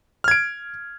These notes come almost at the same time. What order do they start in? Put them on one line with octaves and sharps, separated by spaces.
F6 G#6 D7